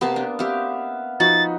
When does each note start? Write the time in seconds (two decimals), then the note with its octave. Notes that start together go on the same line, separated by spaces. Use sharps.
0.01 C3 A#3 B3 A5
0.16 D4
0.39 C4 G4 E5 F5
1.20 F3 D#4 F#4 B4 A6